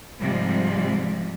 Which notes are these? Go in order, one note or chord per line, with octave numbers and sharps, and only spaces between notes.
G#2 C3 F3 G3 G#3